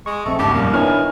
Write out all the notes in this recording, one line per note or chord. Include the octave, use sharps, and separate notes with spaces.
G#3 C#6
A#1 A3 C4 C#6
G#1 D#2 C#3 G4 A5
F2 A#2 G3 A#3
D#3 B3 D4 E4 C#5 G#5 F6